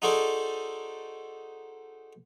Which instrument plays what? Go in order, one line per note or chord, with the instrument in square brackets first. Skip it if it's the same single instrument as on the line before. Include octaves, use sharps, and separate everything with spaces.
[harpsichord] D#4 F#4 G#4 A4 C5 D5